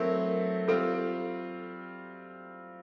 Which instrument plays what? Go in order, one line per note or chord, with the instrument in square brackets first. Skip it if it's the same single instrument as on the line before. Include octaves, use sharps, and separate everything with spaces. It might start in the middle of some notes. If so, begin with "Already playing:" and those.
Already playing: [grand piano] F#3 A3 C4 E4 [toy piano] A#4
[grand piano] G3 C4 F4 [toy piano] A4